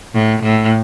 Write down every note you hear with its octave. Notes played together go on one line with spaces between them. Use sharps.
A2
A2